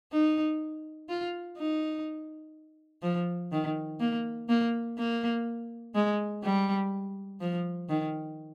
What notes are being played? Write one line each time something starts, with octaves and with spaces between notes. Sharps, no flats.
D#4
F4
D#4
F3
D#3
A#3
A#3
A#3
G#3
G3
F3
D#3